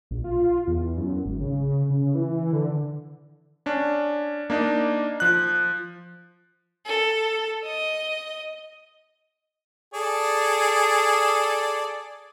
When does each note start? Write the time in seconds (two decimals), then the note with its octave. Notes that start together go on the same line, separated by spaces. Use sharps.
0.11 A#1
0.24 F4
0.67 E2
0.98 F#2
1.26 G#1
1.41 C#3
1.90 C#3
2.15 E3
2.53 D3
3.66 C#4 D4
4.50 A#3 D4 D#4
5.20 F3 F#6
6.85 A4
7.64 D#5
9.94 G#4 A4 D5